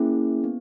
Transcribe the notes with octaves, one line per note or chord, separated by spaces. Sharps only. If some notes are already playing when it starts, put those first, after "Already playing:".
Already playing: A#3 C#4 E4 G#4
B3